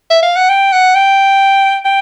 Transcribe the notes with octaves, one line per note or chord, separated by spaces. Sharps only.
E5
F5
F#5
G5
F#5
G5
G5